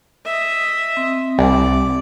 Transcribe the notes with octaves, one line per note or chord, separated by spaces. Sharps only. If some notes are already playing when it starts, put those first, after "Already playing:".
D#5 E5
C4
C2 D5